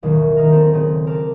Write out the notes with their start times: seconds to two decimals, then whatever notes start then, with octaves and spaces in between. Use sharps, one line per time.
0.03 A1 D#2 B2 D#3 E3 F#3
0.37 D#3 A#3 D#4 A#4
0.52 C4 A4
0.73 D#1 C#3 C4 D#7
1.07 A#4 A5 D6